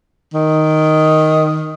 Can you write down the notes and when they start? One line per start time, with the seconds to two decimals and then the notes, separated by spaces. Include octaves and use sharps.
0.34 D#3